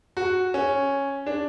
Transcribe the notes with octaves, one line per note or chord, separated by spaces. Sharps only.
F#4
C#4
D4